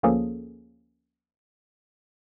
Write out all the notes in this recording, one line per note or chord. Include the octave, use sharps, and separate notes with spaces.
D2 F3 A#3 C#4 G#4 A4